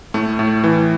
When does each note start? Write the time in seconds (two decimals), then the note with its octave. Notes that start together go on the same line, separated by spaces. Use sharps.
0.14 A2 A3
0.39 A2
0.64 E3